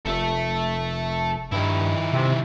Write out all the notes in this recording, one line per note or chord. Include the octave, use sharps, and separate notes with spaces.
F1 A4 E5
G2 D#3 E4
C3